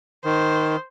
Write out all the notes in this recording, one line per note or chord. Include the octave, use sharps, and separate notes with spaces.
D#3 C5